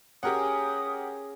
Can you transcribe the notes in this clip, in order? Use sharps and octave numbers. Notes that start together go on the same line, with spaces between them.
C#4 G4 G#4 A#4 F#5 D#6